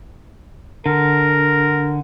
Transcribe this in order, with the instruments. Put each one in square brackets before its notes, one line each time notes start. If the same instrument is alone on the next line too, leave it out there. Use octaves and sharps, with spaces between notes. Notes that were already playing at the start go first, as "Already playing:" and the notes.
[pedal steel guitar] D3 [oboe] A#4